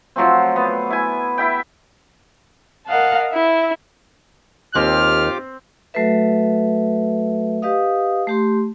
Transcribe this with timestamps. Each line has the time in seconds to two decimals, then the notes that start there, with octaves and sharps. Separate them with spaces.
0.16 F3 F#3 A3 C4
0.56 B3
0.90 E4 G#5
1.38 E4 E5 G5
2.87 A#4 D#5 F5 F#5 A5
3.32 E4 E5
4.75 D#2 C4 F4 G4 D6 F6
5.94 F#3 A3 F#4 A4 B4 E5
7.62 G4 B4 D#5 F5 D#6
8.27 A3 G4 C6